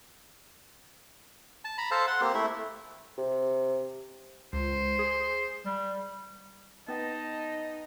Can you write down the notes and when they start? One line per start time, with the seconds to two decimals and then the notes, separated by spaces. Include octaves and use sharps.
1.65 A5
1.78 A#5 B5
1.91 A4 C5 F5 A5
2.07 F#5 C6
2.21 A#3 C4 G4
2.34 A3 E4 E5
3.18 C3
4.53 C#2 C5
4.99 G#4
5.66 G3
6.88 B3 D#4 B4 D#5 G5 A5